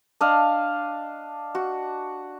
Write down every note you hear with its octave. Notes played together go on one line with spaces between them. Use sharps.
D4 D#5 F5
F#4